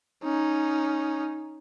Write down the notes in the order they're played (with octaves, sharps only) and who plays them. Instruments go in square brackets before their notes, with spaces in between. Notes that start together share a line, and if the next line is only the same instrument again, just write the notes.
[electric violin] C#4 D#4